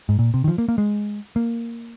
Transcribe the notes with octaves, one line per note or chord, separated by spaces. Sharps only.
G#2
A#2
C3
D#3
F3
A#3
A#3
G#3
A#3